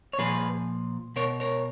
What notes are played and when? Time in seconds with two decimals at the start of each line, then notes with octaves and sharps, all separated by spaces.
0.13 C#5
0.19 A#2 F3 G#4 B4
1.16 B2 A#4 C#5
1.40 A#4 C#5